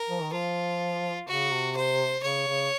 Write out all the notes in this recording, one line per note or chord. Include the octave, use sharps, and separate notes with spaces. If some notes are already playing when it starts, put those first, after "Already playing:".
Already playing: A#4
F3
D#3
F3 F4
C#3 F#4
C3
C5
C#3 C#5
C#3